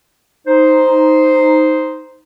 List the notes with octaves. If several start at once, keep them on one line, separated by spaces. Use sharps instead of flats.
D#4 C5